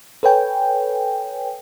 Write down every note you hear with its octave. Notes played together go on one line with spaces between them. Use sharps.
A4 B4 C#5 G5 G#5